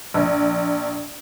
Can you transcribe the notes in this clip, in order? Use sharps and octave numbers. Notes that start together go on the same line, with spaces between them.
A#1